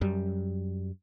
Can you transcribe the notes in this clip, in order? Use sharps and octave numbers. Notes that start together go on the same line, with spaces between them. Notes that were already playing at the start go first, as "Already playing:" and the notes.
F#2 G3